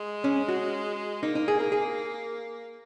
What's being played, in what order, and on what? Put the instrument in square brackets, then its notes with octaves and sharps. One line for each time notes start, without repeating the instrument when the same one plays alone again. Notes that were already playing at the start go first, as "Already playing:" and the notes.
Already playing: [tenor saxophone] G#3
[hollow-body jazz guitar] C#4
F#4
[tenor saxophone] A#3 [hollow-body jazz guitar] D#4
[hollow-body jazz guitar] D#4
G#4
A#4
G#4